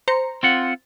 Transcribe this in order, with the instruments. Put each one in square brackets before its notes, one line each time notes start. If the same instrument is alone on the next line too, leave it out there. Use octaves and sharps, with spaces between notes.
[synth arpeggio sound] C5 A#5 C#7
[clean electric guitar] C4 F4 F#5